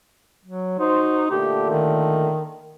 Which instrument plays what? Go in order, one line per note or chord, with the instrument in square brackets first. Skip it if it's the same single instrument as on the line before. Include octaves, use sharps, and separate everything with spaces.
[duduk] F#3
[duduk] D#4 [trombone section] F#4 C5
[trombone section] A#2 D3 A3 [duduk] G4
[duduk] D#3